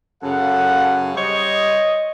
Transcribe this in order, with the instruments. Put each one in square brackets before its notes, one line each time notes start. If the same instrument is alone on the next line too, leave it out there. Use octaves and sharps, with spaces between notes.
[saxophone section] F#2 C#3 [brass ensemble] A4 F5 F#5
[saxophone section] G3 C5 C#5 [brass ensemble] D#5